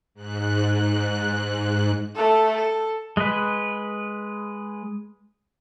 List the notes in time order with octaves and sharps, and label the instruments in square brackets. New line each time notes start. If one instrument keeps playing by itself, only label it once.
[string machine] G#2 F#6
[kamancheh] A3 A4
A4
[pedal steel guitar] G#3 B4